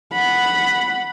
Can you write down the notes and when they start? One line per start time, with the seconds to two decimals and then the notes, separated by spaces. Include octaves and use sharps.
0.13 F#5 B5